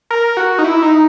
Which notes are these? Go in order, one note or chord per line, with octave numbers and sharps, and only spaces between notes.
A#4
F#4
D#4
E4
D#4